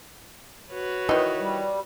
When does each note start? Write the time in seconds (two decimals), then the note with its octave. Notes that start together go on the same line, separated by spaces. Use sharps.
0.71 F#4 B4 C#5
1.09 D#3 E3 D#5
1.40 G3